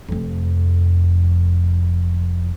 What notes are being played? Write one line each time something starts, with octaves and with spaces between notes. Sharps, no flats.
F1 F2